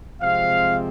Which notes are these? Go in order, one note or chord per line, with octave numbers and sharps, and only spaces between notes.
C3 F3 G#3 C4 F5